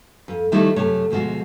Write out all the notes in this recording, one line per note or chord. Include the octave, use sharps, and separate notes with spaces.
F2
D#3 F3 G3 A3 D#4 E4
F#2 C3 A3 C#5
D2 B2 F3 G#3 F#4